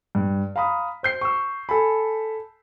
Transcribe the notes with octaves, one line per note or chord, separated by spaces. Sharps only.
G2
F5 A#5 B5 D#6
C5 G6 C7
C#6 E6
A4 G#5 B5